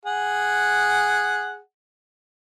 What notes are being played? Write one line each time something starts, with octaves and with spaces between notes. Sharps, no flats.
G#4 F#5